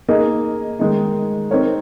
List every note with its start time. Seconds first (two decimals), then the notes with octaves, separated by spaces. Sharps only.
0.08 A#3 D#4 G#4 D#5
0.79 D#3 G#3 D#4
1.51 C4 D#4 A#4 C#5